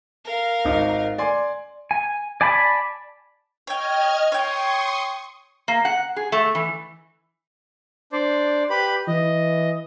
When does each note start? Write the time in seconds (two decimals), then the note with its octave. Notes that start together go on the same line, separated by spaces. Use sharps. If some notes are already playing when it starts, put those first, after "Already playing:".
0.25 A#4 F5
0.65 G#1 D#4
1.18 D5 G#5 C6
1.91 G#5
2.41 D5 G#5 A5 B5
3.67 C#5 D#5 G5 F6 G#6
4.32 C#5 G5 C6 C#6 D#6
5.68 A#3
5.85 F#5
6.16 G#4
6.32 A3
6.55 E3
8.12 D4 C5 D5
8.70 G4 B4 B5
9.08 E3 D#5